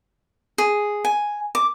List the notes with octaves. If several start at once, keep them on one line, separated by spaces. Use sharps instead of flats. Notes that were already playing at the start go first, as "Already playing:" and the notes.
G#4
G#5
D6